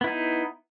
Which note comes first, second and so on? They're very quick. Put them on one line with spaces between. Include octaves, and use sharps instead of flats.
B3 E4 D#4